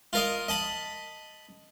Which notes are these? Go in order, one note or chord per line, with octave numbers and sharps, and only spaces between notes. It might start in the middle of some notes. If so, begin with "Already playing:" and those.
F4 A#4 D#5
D#5 A5 B5